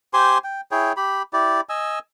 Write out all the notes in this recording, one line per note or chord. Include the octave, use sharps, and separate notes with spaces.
G4 C5 G#5 C6
G5
E4 G#4 C#5 G5
G4 B5
E4 G4 D5
D#5 G#5 E6